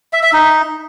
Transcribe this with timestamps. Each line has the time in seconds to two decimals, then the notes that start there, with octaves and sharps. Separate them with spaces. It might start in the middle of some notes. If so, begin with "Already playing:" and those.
0.13 E5
0.23 E5
0.33 D#4